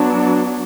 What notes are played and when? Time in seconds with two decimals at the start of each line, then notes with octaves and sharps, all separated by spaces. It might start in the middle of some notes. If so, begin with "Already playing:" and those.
Already playing: F#3 B3 D4